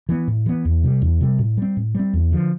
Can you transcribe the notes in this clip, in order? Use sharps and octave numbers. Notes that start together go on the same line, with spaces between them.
E3 B3
A2
E3 B3
E2
C3 G3
E2
C3 G3
A2
G3 C4
A2
G3 C4
E2
D3 F3